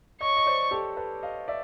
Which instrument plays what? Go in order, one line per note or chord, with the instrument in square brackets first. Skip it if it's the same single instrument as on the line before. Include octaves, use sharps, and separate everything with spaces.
[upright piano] C#5 D#5 [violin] C#6
[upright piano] D#5
C5 D5
G4 A4
A4 B4
D#5 F5
D5 E5